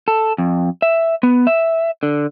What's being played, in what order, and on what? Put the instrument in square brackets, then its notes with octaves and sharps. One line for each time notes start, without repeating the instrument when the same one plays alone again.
[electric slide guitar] A4
F2
E5
B3
E5
D3